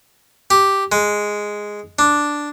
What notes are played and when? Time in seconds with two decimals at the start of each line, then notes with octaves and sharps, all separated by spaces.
0.50 G4
0.92 G#3
1.99 D4